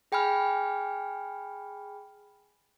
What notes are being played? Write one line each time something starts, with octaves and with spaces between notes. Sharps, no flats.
G#4 G5 G#5 B5 F6